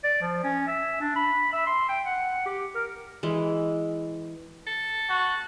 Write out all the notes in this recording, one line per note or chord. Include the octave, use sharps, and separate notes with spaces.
D5
F3
C#4
E5
D4
B5
E5
C6
G5
F#5
G4
A#4
E3 G#3
A4
F#4